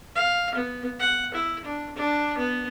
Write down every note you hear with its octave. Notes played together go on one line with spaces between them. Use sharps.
F5
B3
F#5
E4
D4
D4
B3